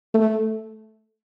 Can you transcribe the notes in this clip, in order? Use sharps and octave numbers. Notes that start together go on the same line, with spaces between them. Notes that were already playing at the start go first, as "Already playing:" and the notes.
A3